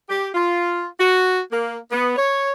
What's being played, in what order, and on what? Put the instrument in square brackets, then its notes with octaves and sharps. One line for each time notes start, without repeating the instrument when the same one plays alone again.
[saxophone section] G4
F4
F#4
A#3
B3
C#5